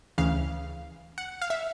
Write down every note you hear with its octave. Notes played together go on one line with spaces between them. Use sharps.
D2 C#3 E3 F5
F#5
F5
E5